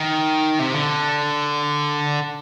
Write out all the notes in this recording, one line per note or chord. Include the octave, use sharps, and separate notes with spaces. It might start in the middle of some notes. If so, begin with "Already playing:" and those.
Already playing: D#3
C3
D3